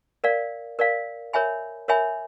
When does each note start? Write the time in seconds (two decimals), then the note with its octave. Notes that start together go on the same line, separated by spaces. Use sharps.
0.24 A#4 D5 F5
0.79 A#4 D5 F5
1.33 A#4 C#5 E5 G#5 B5
1.88 A#4 C#5 E5 G#5 B5